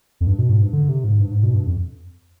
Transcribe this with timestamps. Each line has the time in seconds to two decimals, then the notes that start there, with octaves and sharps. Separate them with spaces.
0.21 F2
0.27 G2
0.39 B2
0.50 G#2
0.61 G2
0.73 D3
0.89 C3
1.04 G#2
1.20 G2
1.32 G#2
1.43 B2
1.54 G2
1.67 F2